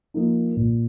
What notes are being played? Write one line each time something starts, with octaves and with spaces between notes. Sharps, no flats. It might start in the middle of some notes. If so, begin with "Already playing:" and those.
F3 A#3 D#4
A#2